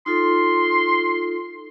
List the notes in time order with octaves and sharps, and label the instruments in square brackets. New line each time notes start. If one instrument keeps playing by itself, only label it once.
[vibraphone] D#4 F4 A4 [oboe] C6